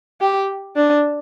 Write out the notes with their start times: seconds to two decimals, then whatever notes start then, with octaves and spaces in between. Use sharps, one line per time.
0.21 G4
0.76 D4